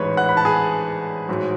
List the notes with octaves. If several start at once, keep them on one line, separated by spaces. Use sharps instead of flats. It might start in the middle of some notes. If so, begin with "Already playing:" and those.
Already playing: A1 G#2 G#3 B4 C#5 C#6
F#5 F#6
B5
A5
G#4 G#5
A1 G#2 F#3